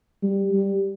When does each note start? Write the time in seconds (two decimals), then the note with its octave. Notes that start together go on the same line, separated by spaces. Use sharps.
0.22 G3
0.52 G3